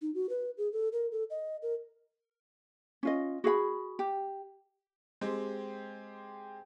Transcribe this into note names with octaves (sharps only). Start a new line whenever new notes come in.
D#4
F#4
B4
G#4
A4
A#4
A4
D#5
A#4
C#4 F4 D#5
F#4 G#4 F5 B5
G4
G#3 C4 G4